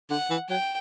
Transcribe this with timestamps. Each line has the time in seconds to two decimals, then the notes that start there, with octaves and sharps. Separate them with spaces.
0.10 D3 F#5
0.31 E3
0.50 F#3 G5